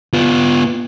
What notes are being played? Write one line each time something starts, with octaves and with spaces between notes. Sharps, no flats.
B3 F4